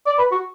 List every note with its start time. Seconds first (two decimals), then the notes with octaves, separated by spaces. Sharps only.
0.06 D5
0.18 B4
0.32 F#4